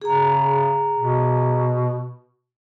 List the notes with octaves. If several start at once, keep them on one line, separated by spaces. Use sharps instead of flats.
C#3 G#4 A#5
B2